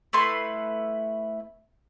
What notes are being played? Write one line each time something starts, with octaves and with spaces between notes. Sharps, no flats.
A3 E4 B4 C6